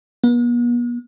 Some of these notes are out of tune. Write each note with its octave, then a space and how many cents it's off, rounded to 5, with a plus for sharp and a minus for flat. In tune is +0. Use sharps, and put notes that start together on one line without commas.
B3 -45